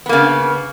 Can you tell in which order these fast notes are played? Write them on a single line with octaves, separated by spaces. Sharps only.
B3 A#3 C#3